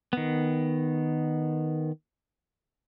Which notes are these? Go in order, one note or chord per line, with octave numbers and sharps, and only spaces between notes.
D#3 B3